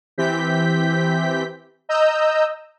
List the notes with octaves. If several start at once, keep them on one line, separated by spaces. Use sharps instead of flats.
E3 C4 G4 G6 B6
D#5 A#5 E6 G6